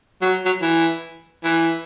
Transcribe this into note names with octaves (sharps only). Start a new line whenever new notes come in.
F#3
F#3
E3
E3